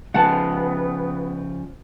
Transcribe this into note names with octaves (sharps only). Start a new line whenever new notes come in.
C#3 F3 B3 F#5 A5